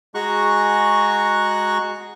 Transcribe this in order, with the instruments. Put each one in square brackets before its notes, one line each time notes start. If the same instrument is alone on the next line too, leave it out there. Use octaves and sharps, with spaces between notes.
[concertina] G#3 F#4 G#4 A#5 C#6 F#6